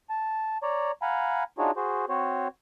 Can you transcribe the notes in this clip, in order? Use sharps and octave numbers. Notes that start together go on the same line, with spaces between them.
A5
C#5 D5 A#5
F5 F#5 G#5 A#5 B5
D4 D#4 F4 F#4 G#4 C#5
F#4 G#4 C5
C4 F#4 C5 C#5